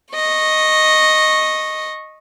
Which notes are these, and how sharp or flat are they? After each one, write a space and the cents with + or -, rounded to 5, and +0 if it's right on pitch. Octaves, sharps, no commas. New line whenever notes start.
D#5 +0 C#6 -15